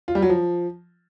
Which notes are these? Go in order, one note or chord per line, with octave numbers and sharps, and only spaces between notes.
F4
G3
F#3
F3